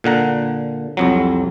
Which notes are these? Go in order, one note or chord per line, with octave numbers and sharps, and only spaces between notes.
A#2 D3 F#5 A#5
C2 F2 F#3